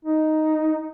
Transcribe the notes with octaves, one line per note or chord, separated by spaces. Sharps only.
D#4